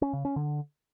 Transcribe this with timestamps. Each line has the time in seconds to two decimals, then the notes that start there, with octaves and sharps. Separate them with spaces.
0.02 C#4
0.13 C#3
0.25 C#4
0.36 D3